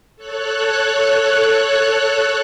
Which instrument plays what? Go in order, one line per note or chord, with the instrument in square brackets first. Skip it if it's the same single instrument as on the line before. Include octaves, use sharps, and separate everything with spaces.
[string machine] A4 C#5 F#6